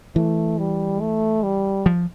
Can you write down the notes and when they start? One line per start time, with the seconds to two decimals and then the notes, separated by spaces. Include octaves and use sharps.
0.16 E3 A3
0.58 G3
1.01 A3
1.43 G3
1.86 F3